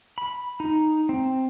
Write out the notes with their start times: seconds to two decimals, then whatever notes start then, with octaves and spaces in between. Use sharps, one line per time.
0.18 B5
0.60 D#4
1.09 C4